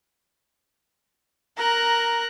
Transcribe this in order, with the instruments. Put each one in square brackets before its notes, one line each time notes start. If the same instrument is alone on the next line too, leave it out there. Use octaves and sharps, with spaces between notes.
[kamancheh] A#4 [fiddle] A#5 F#6